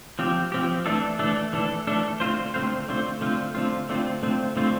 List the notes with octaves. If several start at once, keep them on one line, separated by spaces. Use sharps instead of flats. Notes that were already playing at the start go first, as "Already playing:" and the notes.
F3 C4 G4
F3 C4 G4
E3 A3 D4 A4
E3 A3 D4 A4
E3 A3 D4 A4
E3 A3 D4 A4
D3 A3 C4 F4 C5
D3 A3 C4 F4 C5
D3 A3 C4 F4 C5
D3 A3 C4 F4 C5
D3 A3 C4 F4
D3 A3 C4 F4
D3 A3 C4 F4
D3 A3 C4 F4